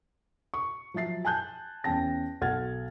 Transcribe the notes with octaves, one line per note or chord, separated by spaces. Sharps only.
C#6
F3 F#3 E5 A6 C7
G#5 A5 F#6 G6
E2 C#4 G5 A5 A#6
B1 A4 F#5 F6 G#6 A6